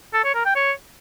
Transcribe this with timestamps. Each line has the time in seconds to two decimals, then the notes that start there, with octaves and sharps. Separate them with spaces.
0.14 A4
0.24 C#5
0.35 A#4
0.45 G5
0.56 C#5